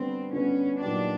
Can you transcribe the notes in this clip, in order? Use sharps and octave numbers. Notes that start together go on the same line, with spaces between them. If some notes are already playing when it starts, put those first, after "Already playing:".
Already playing: D3 G3 B3 C4
D3 G3 B3 C#4
A#2 F#3 B3 D4 D#4 G4